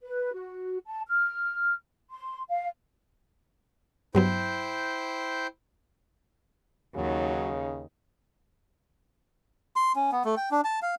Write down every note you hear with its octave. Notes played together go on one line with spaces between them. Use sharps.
B4
F#4
A5
F6
C6
F5
G2 F#3 B3 E4 C5 G5
D#2 C#3 F#3 D#4
C6
C#4
B3
A3
G5
D4
A5
F5